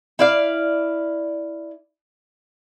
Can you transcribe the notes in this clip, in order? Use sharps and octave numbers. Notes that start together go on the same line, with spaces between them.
E4 D5 F5